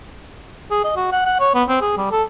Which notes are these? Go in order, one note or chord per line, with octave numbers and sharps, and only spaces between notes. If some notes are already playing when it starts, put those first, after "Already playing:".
G#4
D#5
F#4
F#5
F#5
C#5
B3
C4
G#4
G3
A4